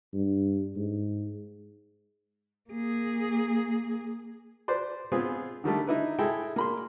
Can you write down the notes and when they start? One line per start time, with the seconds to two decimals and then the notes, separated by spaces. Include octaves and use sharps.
0.14 G2
0.76 G#2
2.70 A#3 G#4
4.68 B4 C5 D5 C6
5.12 G#3 B3 C4 F4 G#4
5.64 D3 D#3 G3 A3
5.87 D#4 E4 B4
6.18 G#3 E4 A4 G5
6.56 A#3 B5 C6